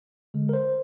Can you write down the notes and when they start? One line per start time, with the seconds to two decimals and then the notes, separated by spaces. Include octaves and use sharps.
0.34 D3 G#3
0.49 A#4
0.53 C5